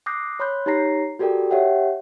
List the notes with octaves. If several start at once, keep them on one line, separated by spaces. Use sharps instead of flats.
D6 D#6 F#6 G6 A#6 C7
C#5 B5 C6 F#6 G6
D#4 G4 C#5 A#5 A#6 C7
F#4 G4 A4 A#4 D5 G5
G4 C#5 E5 F#5 G5